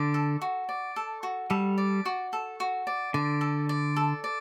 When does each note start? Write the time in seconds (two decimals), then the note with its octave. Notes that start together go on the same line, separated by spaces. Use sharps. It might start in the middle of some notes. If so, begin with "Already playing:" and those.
Already playing: D3 D5
0.14 A4
0.41 F#4
0.69 D5
0.96 A4
1.23 F#4
1.50 G3 A4
1.78 D5
2.05 F#4
2.33 A4
2.60 F#4
2.87 D5
3.14 D3 D5
3.41 A4
3.69 D5
3.96 A4
4.24 D5